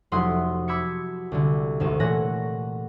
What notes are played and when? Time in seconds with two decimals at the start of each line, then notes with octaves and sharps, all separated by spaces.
0.12 F1 F#3 E4 F#5 C6 D#6
0.68 B5 D6 E6 G#6 C#7
1.32 C2 D3
1.80 G#1 D2 E7
2.00 A#2 E3 A3 C#5 F#5 A#6